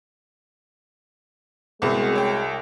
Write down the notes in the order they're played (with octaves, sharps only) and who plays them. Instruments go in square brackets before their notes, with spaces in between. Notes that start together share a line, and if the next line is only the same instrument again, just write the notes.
[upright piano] C2 [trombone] G#3 [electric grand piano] B3 C4 F#4
[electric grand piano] C#5 G5